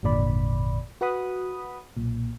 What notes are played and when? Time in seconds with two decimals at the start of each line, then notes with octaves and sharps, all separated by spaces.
0.03 G#1 F2 A#2 D3 D5 B5
1.01 F#4 B4 F#5 B5 D#6
1.97 B1 A#2